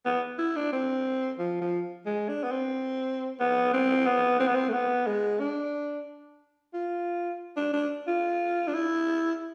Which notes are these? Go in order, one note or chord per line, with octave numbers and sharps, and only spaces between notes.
B3
E4
D4
C4
F3
F3
G#3
D4
B3
C4
B3
C4
B3
C4
B3
C4
A3
B3
G#3
D4
F4
D4
D4
F4
D4
E4